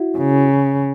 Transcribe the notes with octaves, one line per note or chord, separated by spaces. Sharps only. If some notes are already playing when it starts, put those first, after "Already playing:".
Already playing: E4 F#4
C#3